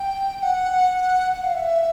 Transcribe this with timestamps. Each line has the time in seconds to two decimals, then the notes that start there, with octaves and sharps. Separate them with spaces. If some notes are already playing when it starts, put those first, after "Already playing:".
Already playing: G5
0.42 F#5
1.33 F#5
1.44 F5
1.54 E5